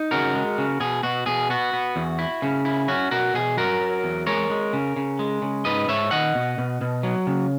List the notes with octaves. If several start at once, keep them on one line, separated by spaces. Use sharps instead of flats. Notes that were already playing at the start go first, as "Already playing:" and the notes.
Already playing: D#4
C#3 F#4 A#4
G#3
C#3
B2 G#4
B2 F#4
B2 G#4
B3 F#4
B3
E2
E4
C#3
E4
C#4 F#4
B2 F#4 A#4
B2 G#4
F#3 F#4 A#4
F#3
E2
G#3 A#4 C#5
G#3
C#3
C#3
G#3
C#3
G#2 B4 D#5
G#2 C#5 E5
D#3 D#5 F#5
B2
B2
B2
F#3
C#3